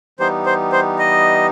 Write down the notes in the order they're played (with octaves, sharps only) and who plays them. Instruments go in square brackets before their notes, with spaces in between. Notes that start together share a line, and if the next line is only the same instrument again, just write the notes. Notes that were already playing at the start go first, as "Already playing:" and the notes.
[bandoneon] E3 G3 B3 D#4 G4 [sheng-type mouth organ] C5
[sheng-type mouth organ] C5
C5
D#5